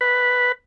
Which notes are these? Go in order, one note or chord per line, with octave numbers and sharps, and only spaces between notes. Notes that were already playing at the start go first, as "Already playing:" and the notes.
B4